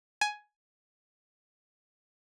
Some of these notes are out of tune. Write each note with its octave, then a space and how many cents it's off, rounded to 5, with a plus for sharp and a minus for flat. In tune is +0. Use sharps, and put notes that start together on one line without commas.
G#5 +10